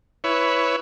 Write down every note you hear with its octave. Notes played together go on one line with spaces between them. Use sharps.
E4 B4 C#5